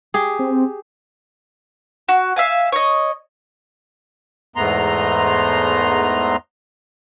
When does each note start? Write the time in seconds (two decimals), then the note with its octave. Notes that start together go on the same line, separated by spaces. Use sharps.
0.14 G4 G#4
0.39 C4
2.09 F#4
2.36 E5 F5 G#5
2.72 C#5 D#5
4.56 E2 G#2 A3 B3 A#5 C6